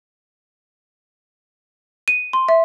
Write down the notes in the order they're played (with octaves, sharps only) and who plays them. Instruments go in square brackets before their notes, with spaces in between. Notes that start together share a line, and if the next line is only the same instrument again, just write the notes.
[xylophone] D#7
C6
E5